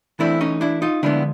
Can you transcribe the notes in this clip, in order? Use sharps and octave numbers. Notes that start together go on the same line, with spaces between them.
E3 A3 C4 D4 E4
C#4 D#4
D4 E4
D#4 F4
D3 F3 G#3 B3 D4 E4